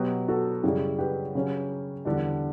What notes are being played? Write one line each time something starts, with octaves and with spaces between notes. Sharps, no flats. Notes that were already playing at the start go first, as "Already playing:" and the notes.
Already playing: B2 F#3 B3 G4 B4
F#4 A4
F#2 C#3 G3 E4 G4
G4 B4
C#3 F#3 C#4
E2 D3 G3 D4